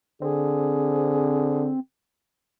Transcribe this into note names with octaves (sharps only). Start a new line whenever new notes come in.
D3 C4 G#4